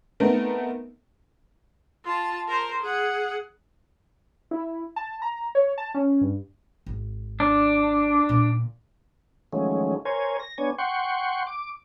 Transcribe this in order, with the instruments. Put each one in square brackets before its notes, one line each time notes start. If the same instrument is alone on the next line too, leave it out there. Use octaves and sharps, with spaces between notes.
[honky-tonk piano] A3 B3 C4 D#4 A#4
[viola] F4 A5
A#4 C5
G#4 F#5
[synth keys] E4
A5
A#5
C#5
A5
C#4
G2
[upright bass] G#1
[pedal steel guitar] D4
[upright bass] A#2 D3
[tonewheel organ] D#3 F3 F#3 G#3 A3 C#4
A#4 C5 C#5 G#5
A#6
B3 D4 C#5 G#5
F#5 G5 C6 C#6
D6